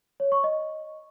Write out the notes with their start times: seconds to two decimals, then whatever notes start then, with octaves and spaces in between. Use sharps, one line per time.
0.20 C#5
0.32 C#6
0.44 D#5